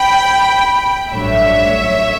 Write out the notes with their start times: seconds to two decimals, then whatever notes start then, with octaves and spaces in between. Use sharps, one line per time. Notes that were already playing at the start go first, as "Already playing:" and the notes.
Already playing: G5 B5
1.13 A1 G2 F#3 A3 D4 C#5 E5